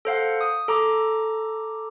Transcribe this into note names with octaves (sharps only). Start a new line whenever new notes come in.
A4 C5 F5 F#5
D#6
A4 A#5 D6